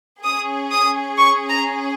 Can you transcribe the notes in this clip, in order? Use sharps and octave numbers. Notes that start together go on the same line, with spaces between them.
C#4 G#4 D#6
D#6
C#6
A#5